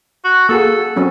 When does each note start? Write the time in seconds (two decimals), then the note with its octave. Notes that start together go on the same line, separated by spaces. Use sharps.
0.24 F#4
0.49 A#3 F#4 G#4 A4
0.96 F#3 C4 C#4